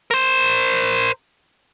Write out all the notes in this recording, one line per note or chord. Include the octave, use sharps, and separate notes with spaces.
A#4 C5